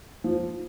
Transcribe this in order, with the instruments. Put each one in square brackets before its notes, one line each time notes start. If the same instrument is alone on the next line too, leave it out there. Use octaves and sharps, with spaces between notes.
[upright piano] F3